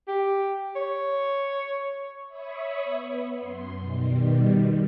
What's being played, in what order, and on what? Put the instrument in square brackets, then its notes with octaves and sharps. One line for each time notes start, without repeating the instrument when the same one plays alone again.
[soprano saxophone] G4
C#5
[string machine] C#5 E5 B5 C#6 D#6
B3
F#2 C6
B2 D#3 G3